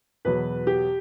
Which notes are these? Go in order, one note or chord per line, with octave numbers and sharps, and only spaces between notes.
E2 B2 F#3 B4
G4